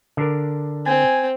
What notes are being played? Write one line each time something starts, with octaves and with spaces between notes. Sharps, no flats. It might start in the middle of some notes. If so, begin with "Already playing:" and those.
D3 D4 A#4
C4 G#5